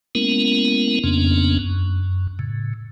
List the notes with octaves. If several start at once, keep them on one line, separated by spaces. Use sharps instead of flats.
G#3 A#3 B3 C#4 E4 A#4
F2 C#3 A#3 B3 C#4 D4
F#2
A2 C#3